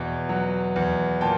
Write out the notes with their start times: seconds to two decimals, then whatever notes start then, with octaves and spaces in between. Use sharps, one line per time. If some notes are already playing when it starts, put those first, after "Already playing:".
Already playing: E2 B2
0.29 F#3
0.76 E2
1.21 A#2 G5 A5